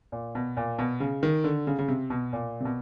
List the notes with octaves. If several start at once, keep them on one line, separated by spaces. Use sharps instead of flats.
A#2
B2
A#2
B2
C#3
D#3
D3
C#3
C#3
C3
B2
A#2
C3
B2